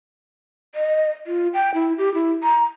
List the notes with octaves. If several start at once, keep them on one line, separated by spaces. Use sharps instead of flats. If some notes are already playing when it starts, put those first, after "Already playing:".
D#5
F4
G5
E4
G4
E4
A#5